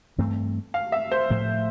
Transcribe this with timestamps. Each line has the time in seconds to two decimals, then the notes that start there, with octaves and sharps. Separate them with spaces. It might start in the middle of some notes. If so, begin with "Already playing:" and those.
0.18 G2 E3 A3 C4
0.74 F5
0.92 E5
1.12 C5
1.30 A2 F3 A3